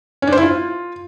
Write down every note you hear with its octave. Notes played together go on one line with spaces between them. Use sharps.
C#4
D4
C5
E4
F4